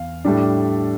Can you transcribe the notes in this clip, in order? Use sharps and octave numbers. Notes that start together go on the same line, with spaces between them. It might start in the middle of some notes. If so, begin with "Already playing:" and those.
Already playing: E2 F5
A2 G3 D4